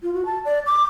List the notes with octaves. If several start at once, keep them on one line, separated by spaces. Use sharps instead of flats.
F4
F#4
A5
D5
D6